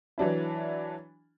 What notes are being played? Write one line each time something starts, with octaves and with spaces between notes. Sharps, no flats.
E3 F#3 D4 E4